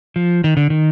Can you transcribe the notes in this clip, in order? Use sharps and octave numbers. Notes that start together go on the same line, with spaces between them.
F3
D#3
D3
D#3